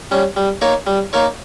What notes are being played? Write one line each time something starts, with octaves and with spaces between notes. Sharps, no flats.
G3 C#4
G3
A#3 D#4 A#4 C#5
G3
A#3 D#4 A#4 C#5